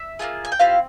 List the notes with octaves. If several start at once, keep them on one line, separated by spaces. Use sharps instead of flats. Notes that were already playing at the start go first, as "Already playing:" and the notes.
Already playing: E5
A#3 C#4 F4 G#4
G#5
G5
C4 E4 F4 G4 F5